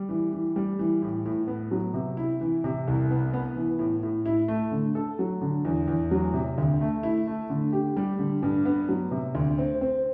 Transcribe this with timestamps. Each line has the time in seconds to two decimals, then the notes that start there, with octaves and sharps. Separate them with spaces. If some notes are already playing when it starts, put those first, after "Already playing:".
Already playing: G3
0.09 E3
0.33 E3
0.56 G3
0.79 E3
1.02 A2
1.25 A2
1.48 B3
1.71 F#3
1.94 C3
2.17 E4
2.41 E3
2.64 C3
2.88 C2
3.11 B3
3.33 B3
3.56 E3
3.79 A2
4.03 A2
4.25 E4
4.48 A3
4.72 D3
4.95 A4
5.19 F#3
5.41 D3
5.65 E2
5.88 E2
6.11 F#3
6.34 C3
6.58 D2
6.81 A3
7.03 E4
7.27 A3
7.50 D3
7.72 G4
7.97 G3
8.19 D3
8.43 G2
8.65 B3
8.89 F#3
9.11 C3
9.35 D2
9.58 C4
9.81 C4